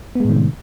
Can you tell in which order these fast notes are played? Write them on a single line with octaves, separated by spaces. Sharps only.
B3 G#3 A2 D#3 C3